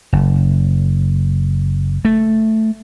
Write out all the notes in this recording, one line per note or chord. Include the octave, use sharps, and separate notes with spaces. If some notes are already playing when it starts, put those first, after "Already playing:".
F#1
A3